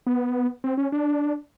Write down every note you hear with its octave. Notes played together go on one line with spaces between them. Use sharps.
B3
C4
C#4
D4